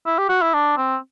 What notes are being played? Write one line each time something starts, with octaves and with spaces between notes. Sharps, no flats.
E4
G4
F#4
E4
D4
C4